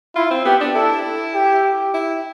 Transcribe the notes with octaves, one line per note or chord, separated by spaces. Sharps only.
E4 F4
C4
B3 G4
D4
E4 A4
G4
E4